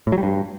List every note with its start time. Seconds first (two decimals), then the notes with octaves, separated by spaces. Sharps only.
0.07 A2
0.12 F#3
0.18 G3
0.23 G2